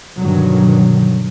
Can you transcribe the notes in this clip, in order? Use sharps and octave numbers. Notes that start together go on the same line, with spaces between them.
G2 B2 D3 D#3 F#3